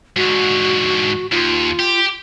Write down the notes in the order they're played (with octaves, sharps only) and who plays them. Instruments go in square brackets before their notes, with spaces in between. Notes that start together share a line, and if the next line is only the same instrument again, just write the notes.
[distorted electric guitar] G#2 D3 [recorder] F#4
[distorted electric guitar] D#2 [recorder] F4
[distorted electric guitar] G4